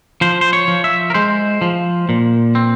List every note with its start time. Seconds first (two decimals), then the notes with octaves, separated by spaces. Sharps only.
0.21 F3 C5
0.41 C5
0.53 C#5
0.68 F3
0.84 E5
1.10 A#4
1.14 G#3 C5
1.61 F3
2.09 A#2
2.55 C4